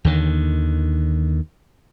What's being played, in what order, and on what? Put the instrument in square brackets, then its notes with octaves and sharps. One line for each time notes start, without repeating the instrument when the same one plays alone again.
[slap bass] D#2 D3 D#3